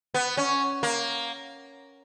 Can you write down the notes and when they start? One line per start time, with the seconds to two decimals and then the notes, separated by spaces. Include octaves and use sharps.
0.14 B3
0.37 C#4
0.83 A#3